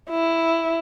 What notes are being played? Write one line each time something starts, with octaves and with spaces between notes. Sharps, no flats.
E4